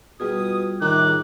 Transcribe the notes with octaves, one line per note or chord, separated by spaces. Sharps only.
B2 G3 F4 G#4 D#6
A2 C3 D#3 D6 F#6